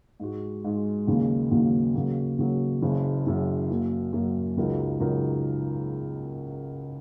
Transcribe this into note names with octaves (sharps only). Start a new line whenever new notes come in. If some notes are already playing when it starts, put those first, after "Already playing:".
G#2 G#3 F#4
G#2 G#3 F#4
D#2 C#3 F#3 A#3
D#2 C#3 F#3 A#3
C#3 F#3 A#3
C#3 F#3 A#3
F#1 F#2 C#3
F#1 F#2 C#3
F#2 F#3 A#3
F#2 F#3 A#3
C#2 C#3 F#3 D#4 A#4
C#2 C#3 F#3 D#4 A#4